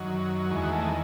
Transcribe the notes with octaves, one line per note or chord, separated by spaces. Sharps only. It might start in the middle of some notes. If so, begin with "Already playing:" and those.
Already playing: F#2 D#3 F#3
E2 D#3 G#3 F#4
A3
G#3